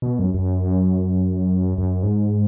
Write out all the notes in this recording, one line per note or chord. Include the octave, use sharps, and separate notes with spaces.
B2
F#2
F#2
F#2
G#2